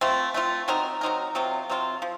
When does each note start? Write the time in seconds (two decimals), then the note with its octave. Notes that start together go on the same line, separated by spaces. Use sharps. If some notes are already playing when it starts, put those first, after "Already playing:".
0.01 A3 C4 F4
0.34 A3 C4 F4
0.68 F#3 C4 D#4 A#4
1.01 F#3 C4 D#4 A#4
1.35 C3 F#3 C4 F4
1.70 C3 F#3 C4 F4
2.02 F3